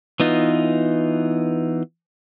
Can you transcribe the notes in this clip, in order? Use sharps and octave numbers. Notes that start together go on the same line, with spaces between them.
E3 B3 D#4 F4